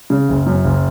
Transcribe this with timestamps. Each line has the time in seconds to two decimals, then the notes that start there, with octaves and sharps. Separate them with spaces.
0.10 C#3
0.28 F#1
0.46 F#2
0.64 F#1